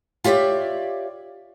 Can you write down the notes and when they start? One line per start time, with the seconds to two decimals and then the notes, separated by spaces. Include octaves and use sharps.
0.24 F4 G4 C#5 D5 E5